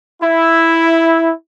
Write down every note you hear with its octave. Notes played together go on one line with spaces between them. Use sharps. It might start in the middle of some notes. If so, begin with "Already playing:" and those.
E4